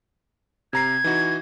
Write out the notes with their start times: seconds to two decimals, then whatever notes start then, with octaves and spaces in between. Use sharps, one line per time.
0.73 C3 A#5 G#6 C7
1.04 E3 D#4 F#4